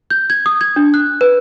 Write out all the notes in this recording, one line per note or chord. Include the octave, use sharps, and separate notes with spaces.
G6
G#6
D#6
G#6
D4
F#6
B4